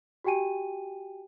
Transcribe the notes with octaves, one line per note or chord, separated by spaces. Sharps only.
F#4 G4 G5 G#5 D#7